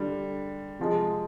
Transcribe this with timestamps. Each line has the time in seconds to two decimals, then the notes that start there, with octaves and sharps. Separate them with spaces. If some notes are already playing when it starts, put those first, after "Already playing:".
Already playing: D3 G3
0.79 C3 F3 G#3